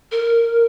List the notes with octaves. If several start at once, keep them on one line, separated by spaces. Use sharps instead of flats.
A#4